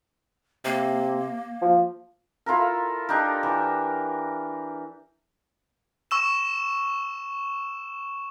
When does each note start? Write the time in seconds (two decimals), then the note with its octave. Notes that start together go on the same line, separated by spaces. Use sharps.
0.65 C3 A#3
1.62 F3
2.46 E4 F4 A4 A#4
3.09 D4 D#4 G4 A#4
3.43 E3
6.11 C#6 E6 E7